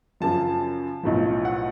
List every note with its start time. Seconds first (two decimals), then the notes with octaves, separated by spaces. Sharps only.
0.20 F#2 C#3 F3 A5
1.03 B1 A2 F3
1.45 F#5